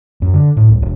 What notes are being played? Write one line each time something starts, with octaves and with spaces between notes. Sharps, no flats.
F#2
D3
A2
C2
E1